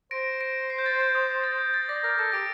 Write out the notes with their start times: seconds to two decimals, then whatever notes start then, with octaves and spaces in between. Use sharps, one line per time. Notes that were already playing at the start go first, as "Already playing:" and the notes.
0.11 C5 A#6 D7
0.41 A#6 D7
0.70 C7
0.78 G6
0.86 A6
1.00 G6
1.15 D#6
1.29 G6
1.44 A6
1.58 G6
1.74 A6
1.88 D5 A#6
2.03 A#4 A#6
2.18 A4 A#6
2.32 G4 A#6 D7